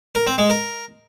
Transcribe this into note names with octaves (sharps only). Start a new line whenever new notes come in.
A#4
C4
G#3
A#4